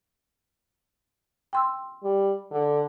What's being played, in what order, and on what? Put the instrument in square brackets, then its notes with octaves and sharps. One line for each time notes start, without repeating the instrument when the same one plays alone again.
[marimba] G5 C6 E6
[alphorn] G3
D3